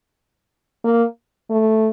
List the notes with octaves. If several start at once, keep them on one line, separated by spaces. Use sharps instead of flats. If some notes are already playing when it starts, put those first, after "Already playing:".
A#3
A3